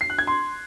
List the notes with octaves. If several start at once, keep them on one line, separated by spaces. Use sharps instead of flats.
C7
F#6
G#6
C6